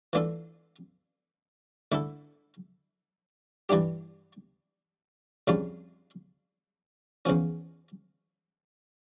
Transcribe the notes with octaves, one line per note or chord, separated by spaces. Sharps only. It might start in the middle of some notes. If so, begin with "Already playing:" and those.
E3 A3 D4 F4 A4
D3 A3 E4 A4
G2 E3 G3 D4 G4
F2 C#3 G3 D4 F4
E2 C#3 F3 C#4